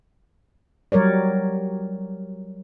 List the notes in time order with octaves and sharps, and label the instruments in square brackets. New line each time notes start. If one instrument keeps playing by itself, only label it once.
[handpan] F#3 G3 A#4 C#5 D5